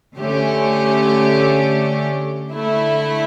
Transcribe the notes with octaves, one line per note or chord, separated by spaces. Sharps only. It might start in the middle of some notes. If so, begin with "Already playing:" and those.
D3 A3 C#4 G4
D3 A3 E4